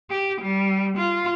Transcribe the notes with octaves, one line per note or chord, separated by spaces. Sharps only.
G4
G3
F4